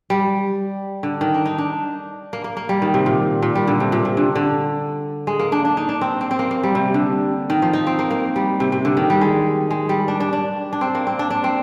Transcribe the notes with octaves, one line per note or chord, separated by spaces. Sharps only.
G3
D3
D#3
D4
D#4
D4
A#3
A#3
A#3
G3
D#3
C3
A#2
A#2
G3
D3
C3
A#2
C3
D3
D3
G#3
A#3
D4
D4
D#4
D4
C4
C4
C4
A#3
A#3
G3
C3
D3
D#3
F3
D#4
C4
A#3
A#3
G3
C3
C3
D3
D#3
G3
G#3
G#3
G3
D4
D4
D4
D4
C4
A#3
C4
D4
D4
C4